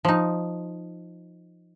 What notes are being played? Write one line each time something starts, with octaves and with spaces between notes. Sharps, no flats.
F3 D#4